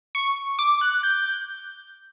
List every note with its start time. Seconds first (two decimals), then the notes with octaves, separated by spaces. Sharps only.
0.15 C#6
0.59 D6
0.81 F#6
1.03 G6